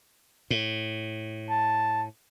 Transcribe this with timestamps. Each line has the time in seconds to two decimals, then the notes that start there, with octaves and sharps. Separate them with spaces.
0.50 A2
1.50 A5